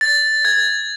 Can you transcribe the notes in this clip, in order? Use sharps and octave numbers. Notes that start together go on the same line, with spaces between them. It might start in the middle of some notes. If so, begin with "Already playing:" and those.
A6
G#6